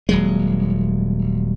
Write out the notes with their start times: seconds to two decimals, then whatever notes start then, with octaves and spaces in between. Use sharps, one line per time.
0.09 D#1 F#3 G#3